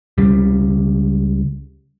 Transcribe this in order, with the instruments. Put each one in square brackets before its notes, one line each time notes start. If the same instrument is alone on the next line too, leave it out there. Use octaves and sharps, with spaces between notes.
[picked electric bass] C#2 C#3 G3